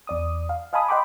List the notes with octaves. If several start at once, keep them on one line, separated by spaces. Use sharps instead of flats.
E2 D5 D#6
F5
D#5 F5 G#5 A5 B5 D#6
D#5 F#5 G5 B5 C6 D6